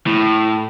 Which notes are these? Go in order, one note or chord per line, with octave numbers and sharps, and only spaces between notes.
A2